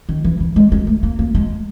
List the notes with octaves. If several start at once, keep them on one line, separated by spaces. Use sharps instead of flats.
D#3
E3
E3
G#3
G#3
A3
A#3
A#3
G#3